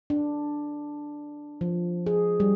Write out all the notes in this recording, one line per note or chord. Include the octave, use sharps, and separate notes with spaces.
D4
F3
G#4
G3